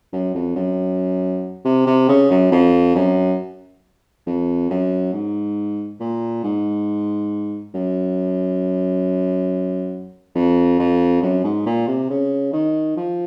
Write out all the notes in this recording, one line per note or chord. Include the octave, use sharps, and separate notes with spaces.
F#2
F2
F#2
C3
C3
C#3
F#2
F2
F#2
F2
F#2
G#2
A#2
G#2
F#2
F2
F2
F#2
G#2
A#2
C3
C#3
D#3
F3